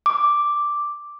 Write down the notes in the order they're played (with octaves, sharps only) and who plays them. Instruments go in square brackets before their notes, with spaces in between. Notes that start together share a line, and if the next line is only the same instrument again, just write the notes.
[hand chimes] D6